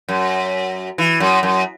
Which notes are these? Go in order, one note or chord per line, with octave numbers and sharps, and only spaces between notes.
F#2
E3
F#2
F#2